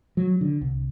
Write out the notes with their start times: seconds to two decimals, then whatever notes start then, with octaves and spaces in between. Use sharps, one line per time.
0.17 F#3
0.41 D3
0.61 C2